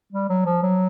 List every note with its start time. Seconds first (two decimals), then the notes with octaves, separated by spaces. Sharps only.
0.13 G3
0.29 F#3
0.46 F3
0.63 F#3